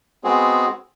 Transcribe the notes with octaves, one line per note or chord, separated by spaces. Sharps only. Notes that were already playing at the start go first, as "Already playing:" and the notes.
G#3 B3 C4 F#4 G#4